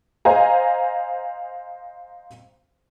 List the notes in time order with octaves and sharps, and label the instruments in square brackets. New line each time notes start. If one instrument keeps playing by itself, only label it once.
[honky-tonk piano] C5 D#5 F5 G#5 A#5